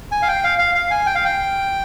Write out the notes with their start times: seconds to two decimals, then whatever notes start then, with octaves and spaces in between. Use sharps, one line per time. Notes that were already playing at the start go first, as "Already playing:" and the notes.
0.12 G#5
0.22 F5
0.28 G5
0.44 F5
0.59 F5
0.75 F5
0.91 G#5
1.06 G5
1.15 F5
1.25 G5